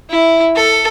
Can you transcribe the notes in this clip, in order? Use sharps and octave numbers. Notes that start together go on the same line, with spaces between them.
E4
A4